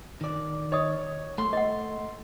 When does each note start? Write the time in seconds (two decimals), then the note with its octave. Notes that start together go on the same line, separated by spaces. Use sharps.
0.21 D#3 D5
0.72 C#5 D#5 D#6
1.38 A3 C6
1.53 D#5 F#5